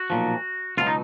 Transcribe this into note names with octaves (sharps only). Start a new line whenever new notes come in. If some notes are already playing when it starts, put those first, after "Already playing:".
Already playing: F#4
B1 A#2 F3
C#2 B2 F#3 F4
D#4